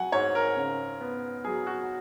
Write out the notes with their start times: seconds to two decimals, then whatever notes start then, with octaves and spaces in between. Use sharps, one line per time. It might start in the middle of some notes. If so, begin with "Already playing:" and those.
Already playing: F#3 F#5 G#5
0.12 G#2 C#5
0.35 A#4
0.56 C#3
1.01 B3
1.45 F#3 G#4
1.67 F#4